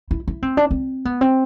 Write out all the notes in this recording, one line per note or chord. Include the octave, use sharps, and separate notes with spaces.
E4
E4
C4
D4
C4
B3
C4